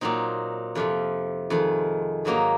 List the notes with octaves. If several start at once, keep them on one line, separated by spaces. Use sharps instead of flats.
A#2 F#3 C4 D#4
F2 C3 F3
F2 D#3 G#3
G#2 F#3 A#3 D#4